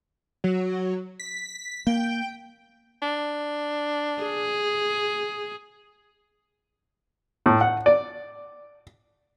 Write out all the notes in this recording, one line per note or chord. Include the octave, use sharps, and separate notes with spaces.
F#3
B6
A#3 G5
D4
G#4
A2
F#5
D5